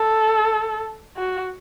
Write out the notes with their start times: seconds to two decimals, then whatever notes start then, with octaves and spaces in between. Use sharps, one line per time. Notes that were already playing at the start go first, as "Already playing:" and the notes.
Already playing: A4
1.17 F#4